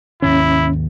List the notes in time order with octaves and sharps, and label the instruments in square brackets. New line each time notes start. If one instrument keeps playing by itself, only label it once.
[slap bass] D#2 G#2 D#3 [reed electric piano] C#4 [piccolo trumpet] E4